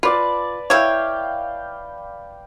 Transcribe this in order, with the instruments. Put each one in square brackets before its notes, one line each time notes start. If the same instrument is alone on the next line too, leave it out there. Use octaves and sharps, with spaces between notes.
[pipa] F4 [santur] B4 D5 A5
[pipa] E4 C#5 [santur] F5 G5